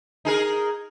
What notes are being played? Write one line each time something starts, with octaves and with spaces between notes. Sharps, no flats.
D#4 G#4 A#4